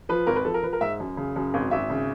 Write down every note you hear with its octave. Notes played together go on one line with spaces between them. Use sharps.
F3 B4
G#1 A#4
B4
F3 A4
A#4
F3 B4
A#4
G#2 E5
F#2
C#3
F#2
G#1
G#1 E5
C#3